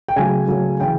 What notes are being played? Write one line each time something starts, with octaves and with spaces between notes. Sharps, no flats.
G5
C#3 F#3 A3 G#5
C#3 F#3 A3
C#3 E3 G5